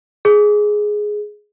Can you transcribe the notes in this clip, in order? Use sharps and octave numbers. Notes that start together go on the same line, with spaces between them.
G#4